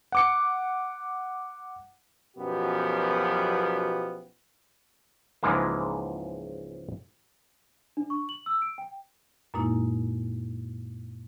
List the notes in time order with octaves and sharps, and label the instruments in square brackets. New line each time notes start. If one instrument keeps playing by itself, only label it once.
[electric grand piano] F#5 D6 C#7
[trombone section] B1 F#2 B2 F3 B3 G4
[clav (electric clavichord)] C#2 G#2 E3 F3 G#3 A#3
[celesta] D4
C#6
F#7
E6
D7
G5
[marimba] F#2 A#2 G#3 A#3 D#4 E4